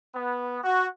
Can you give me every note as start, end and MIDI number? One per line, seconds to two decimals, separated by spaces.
0.14 0.59 59
0.64 0.86 66